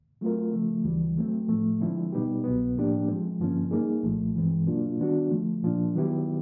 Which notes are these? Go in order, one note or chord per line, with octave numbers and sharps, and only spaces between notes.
F#3 A3 C4 F4 A#4
C#3 F3 A3
D2 C#3 E3 G3
F#3 A3 C4
A2 F3 A3
D3 F3 G#3 C4 E4
B2 G3 B3 D#4 G4
C2 B2 F#3 B3
A2 F3 A#3 D4 G4
F3 G#3 C4
G2 D3 F3 A#3 C#4
G3 A#3 D#4 G#4
C2 A#2 F3 A3
G2 E3 G#3 C4
B2 F#3 A#3 D4 F4
D#3 G3 B3 D4 F#4
D3 F3 A3
A#2 F3 A#3 D4
D#3 F#3 B3 E4 G4